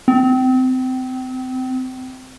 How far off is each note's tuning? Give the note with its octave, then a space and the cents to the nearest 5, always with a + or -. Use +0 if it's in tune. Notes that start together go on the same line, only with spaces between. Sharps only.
C4 -30